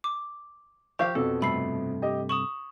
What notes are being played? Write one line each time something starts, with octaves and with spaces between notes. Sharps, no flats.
D6
F3 G4 F5 C#6
F2 B2 A4
G2 C3 A3 B5 C7
G4 D#5
C#6 D#6 E7 F#7